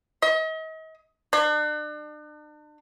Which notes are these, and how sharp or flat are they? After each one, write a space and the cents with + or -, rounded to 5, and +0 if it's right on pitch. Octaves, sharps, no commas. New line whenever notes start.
D#5 +40
D4 +40